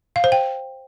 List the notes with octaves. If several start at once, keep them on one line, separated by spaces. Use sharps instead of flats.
F5
C5
G5